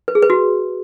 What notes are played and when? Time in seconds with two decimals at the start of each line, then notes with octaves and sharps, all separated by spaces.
0.08 B4
0.15 G#4
0.22 B4
0.30 F#4